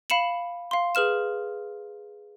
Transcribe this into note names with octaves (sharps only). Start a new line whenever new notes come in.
F5 B5 C#7 E7 F#7
F5 C6
G#4 B4 F6 E7